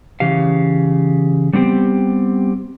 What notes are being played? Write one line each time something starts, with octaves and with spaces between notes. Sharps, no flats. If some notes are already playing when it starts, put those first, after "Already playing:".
C#3 E3 G4 F5
G3 B3 C4 G4